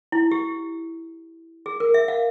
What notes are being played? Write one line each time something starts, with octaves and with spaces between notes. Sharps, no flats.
E4
G4
G#4
A#4
E5
F5